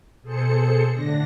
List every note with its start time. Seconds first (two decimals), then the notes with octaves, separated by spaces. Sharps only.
0.22 B2 G#4 A4 C5 C#7
0.92 A2 D3 D4 A#6